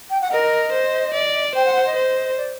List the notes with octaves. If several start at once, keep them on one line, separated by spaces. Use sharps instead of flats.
G5
F#5
A#4 D#5
C5
D5
C5 G5
F#5
F#5
D#5
C5
D5